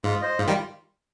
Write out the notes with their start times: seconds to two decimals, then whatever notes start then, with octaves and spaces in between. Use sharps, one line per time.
0.04 G#2 F4
0.21 C5 D#5
0.38 G#2 F4
0.47 D#3 G3